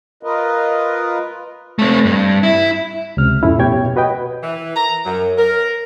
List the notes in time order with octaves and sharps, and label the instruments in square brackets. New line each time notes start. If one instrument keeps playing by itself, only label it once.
[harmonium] F4 A#4 B4 D#5
[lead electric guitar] A3 C4
G2
E4
[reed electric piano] C#2 C3 F6
F2 A2 A3 C#4 E4
B2 G4 C#5 G5 G#6
F#4 B4 D#5 G5
[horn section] E3
A#5
F#2
A#4